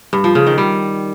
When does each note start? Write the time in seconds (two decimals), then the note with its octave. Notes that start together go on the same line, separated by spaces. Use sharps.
0.13 G2
0.24 F3
0.35 C#3
0.47 D#3
0.58 G3